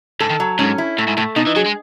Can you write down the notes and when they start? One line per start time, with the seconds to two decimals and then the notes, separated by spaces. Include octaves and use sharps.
0.20 G#2 A4
0.30 D#3
0.40 F#3
0.59 G#2 C#4
0.78 E4
0.98 A2 A3
1.07 G#2
1.17 A2 A3
1.36 B2 D#4
1.47 E3
1.56 F#3 G#4
1.66 G#3